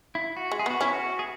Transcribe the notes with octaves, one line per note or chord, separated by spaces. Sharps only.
E4
F#4
G#3
G#4
B3 F#4
C#4 E4
F#4
G#4